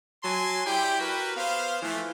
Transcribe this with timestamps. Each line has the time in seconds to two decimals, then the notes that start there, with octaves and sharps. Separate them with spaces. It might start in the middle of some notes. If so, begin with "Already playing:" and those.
0.24 F#3 G#5 A5 C6
0.66 E4 G4 D5 G5
1.00 F#4 A#4 B4
1.37 B3 C5 F5
1.82 E3 F3 A3